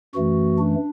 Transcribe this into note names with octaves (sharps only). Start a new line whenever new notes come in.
F#2 E3 A3 F#4
D4